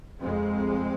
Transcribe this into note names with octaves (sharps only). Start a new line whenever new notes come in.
F2 C3 G#3 C4